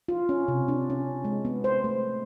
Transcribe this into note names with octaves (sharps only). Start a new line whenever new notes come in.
F4
C#4
C3
D4
C#4
G#3
B3
C5
A3